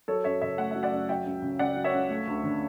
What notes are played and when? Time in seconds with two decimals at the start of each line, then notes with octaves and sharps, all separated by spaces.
0.08 F#3 A4 C#5
0.24 F#2 C#5 E5
0.41 C#3 C#5 E5
0.58 A3 F#5
0.71 F#3 E5
0.83 D5 F#5
0.92 F#2
1.09 F#3 E5 G5
1.26 C#2
1.42 C#3
1.59 C#2 D5 F#5
1.76 F#3
1.84 C#5 E5
1.93 C#2
2.10 A3
2.27 D2
2.44 D3